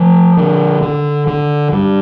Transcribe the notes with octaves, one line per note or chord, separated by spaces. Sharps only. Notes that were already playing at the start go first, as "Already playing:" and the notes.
Already playing: F3 A3
D3
D3
D3
G2